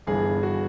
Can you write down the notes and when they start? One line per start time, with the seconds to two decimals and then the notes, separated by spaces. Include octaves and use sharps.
0.07 G1 G2 E3 G#4
0.43 F#4